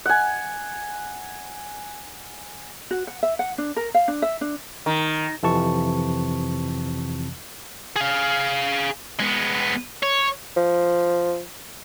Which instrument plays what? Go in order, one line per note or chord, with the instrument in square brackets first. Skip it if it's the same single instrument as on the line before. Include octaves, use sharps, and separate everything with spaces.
[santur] F#5 G#5
[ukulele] F#4
F#5
E5
F#5
D4
A#4
F5
D4
E5
D4
[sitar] D#3
[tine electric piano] F2 C3 E3 A5 C#6
[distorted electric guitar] G#4 F5
G#3 B3
C#5
[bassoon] F3